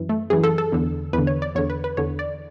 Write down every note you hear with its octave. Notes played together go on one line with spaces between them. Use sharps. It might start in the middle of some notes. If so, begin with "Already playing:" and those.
Already playing: F#2 E3
A3
F#2 E3 G#4
A4
A4
E2 D3
E2 D3 B4
C#5
D5
E2 D3 C#5
B4
B4
E2 D3 C#5
D5